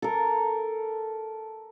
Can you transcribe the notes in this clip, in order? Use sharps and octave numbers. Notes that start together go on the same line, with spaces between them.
A4 A#4